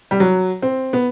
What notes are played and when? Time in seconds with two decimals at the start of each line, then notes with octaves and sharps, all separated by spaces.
0.11 G3
0.20 F#3
0.62 C4
0.93 B3